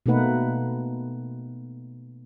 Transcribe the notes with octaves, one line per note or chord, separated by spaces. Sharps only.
B2 A3 A#3 D#4 B4 F#5